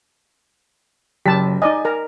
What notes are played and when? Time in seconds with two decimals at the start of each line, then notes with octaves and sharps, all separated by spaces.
1.26 F#1 F#2 G4 A5 B6
1.62 D#4 D5 D#5 G#5
1.85 A#4 A#5